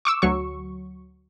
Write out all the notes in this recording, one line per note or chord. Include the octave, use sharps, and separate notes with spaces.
C#6 D6 E6
D2 F#3 C#6